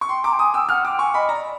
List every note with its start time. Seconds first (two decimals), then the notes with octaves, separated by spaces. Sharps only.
0.01 C#6
0.09 G5 C6
0.24 A#5 D6
0.33 G5
0.39 G#5 D#6
0.54 G5 E6
0.69 F#5 F6
0.84 G5 D6
0.99 G#5 C#6
1.14 D#5 B5
1.29 D5 A#5